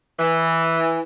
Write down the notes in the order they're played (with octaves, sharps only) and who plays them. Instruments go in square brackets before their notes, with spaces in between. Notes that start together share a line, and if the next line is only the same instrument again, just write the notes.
[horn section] E3